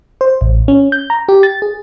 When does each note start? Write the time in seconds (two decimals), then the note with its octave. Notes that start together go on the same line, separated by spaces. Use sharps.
0.21 C5
0.41 A1
0.68 C#4
0.92 G6
1.10 A#5
1.29 G4
1.43 A6
1.62 G#4